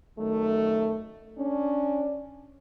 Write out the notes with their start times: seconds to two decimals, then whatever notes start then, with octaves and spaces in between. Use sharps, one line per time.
0.19 F#2 D#3 A3
1.38 C#4 D4